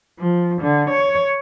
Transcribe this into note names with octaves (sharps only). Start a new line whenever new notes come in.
F3
D3
C#5